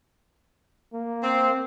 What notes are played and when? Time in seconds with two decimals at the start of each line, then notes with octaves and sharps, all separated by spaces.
0.94 A#3
1.22 C4